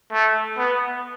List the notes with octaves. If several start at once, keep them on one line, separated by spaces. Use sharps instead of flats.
A3
B3